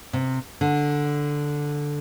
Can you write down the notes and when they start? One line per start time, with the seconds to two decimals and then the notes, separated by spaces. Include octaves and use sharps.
0.13 C3
0.61 D3